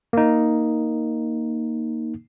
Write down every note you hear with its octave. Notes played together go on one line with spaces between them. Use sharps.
A#3 D#4